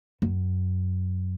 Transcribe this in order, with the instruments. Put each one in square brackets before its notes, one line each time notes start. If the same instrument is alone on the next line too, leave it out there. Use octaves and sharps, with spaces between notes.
[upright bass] F#2